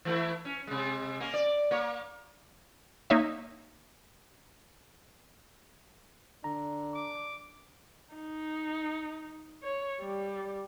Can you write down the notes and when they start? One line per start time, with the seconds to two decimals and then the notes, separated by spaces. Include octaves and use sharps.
0.05 E3 A3 E4
0.45 C#4
0.67 C3 G#3
1.20 A#3 C#4
1.34 D5
1.71 A#3 C#5
3.10 A#3 D#4 C#5 E5
6.44 D3 D4 A#5
6.94 D6
8.13 D#4
9.63 C#5
10.01 G3